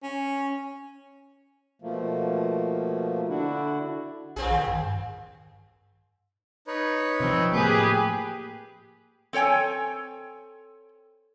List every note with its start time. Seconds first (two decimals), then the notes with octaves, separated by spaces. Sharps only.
0.03 C#4
1.82 B2 F3 A3 A#3
3.28 D3 D4 E4 F#4
4.36 A#1 A#2 C4 G#4
4.51 D#3
4.68 G2
6.67 D#4 B4 C#5
7.20 C3 F3 C4
7.53 A2 F3 A#3 G4 G#4 B4 G6
9.33 C4 A4 C#5 G5 G#5